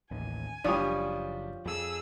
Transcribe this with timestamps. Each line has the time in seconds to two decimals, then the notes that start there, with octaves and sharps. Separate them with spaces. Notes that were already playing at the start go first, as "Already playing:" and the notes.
0.11 A1 D#2 G#5
0.64 F#1 F3 G3 D4 C#5 D#6
1.66 F2 G#4 E6